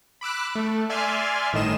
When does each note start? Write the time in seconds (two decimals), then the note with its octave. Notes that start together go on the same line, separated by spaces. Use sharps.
0.21 B5 D6 E6 F#6
0.55 A3
0.89 D5 E5 G#5 C6 F6
1.53 G1 A2 D#3 D#5 E7